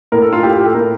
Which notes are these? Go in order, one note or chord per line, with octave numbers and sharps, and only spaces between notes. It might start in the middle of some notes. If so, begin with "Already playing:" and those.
A2 A#4
A4
F4
A2 G4
G4
A4
A2 A#4